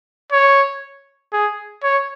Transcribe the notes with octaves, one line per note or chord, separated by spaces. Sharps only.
C#5
G#4
C#5